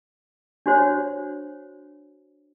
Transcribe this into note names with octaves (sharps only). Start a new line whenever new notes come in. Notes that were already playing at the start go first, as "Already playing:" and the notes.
D4 F#4 C5 C#5